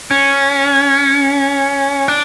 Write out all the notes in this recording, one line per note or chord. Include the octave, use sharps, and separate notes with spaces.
C#4
D4